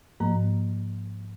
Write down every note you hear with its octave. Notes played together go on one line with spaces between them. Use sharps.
G#2 F3 A#3 A#5